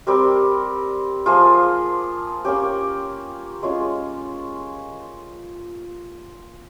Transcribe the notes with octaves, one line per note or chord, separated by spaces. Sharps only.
G3 C4 G4 A#4
F3 A#3 F4 G#4
A#3 C#4 G4
G#3 C#4 F4